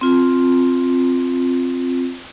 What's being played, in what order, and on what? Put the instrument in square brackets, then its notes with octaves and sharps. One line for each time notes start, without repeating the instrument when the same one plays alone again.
[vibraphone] C4 F4